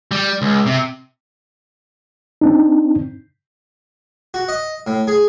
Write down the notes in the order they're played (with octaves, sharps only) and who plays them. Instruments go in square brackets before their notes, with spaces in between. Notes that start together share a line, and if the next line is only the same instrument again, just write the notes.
[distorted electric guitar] G3
C#2
C3
[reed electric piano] C4 D4 D#4
[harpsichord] F#4
D#5
A2
G#4